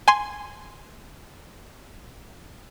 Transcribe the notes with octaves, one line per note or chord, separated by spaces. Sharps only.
G#5 C6